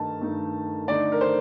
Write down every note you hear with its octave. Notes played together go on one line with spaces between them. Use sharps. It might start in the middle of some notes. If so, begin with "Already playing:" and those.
Already playing: G2 D#3 A3 D#4 A5
G2 D#3 A3 D#4
D3 A3 D#4 D5
A#4
C5